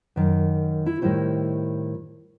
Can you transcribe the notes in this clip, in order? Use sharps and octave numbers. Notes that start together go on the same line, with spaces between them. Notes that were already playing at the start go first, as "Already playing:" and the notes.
F#2 D#3
E4
A2 D#3 G3 E4 C5 C#5